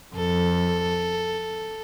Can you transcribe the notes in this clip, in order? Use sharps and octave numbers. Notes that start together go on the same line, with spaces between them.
F2 A4